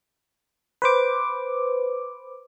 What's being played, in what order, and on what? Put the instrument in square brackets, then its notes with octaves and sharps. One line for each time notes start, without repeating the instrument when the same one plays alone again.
[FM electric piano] B4 C5 D6